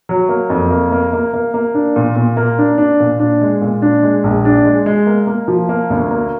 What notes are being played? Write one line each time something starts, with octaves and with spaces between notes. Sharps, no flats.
F#3
A#3
F2
A#3
A#3
A#3
A#3
A#3
D4
A#2
A#2
A#3
D4
D4
A#2
D4
G#3
A#2
D4
G#3
A#1
D4
G#3
G#3
A#3
A#3
F3
A#3
D2
A#3